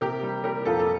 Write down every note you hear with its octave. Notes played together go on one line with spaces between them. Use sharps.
C3 G4 A#4
G3
G3 G4 A#4
F2 F4 A4
A4